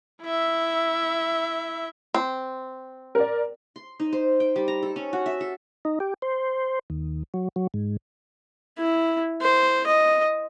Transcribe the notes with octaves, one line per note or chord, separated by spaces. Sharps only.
E4 E5
C4
A#4 D5
C6
D#4
C5
G5
G3
A#5
A4
C#4
F#4
E5
A4
D#4
G4
C5
D#2
F#3
F#3
G#2
E4
C5
D#5